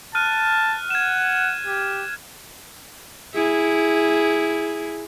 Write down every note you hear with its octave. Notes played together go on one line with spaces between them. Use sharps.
A5 F6 F#6 D#7
F#5 G#6 E7
G4
E4 G#4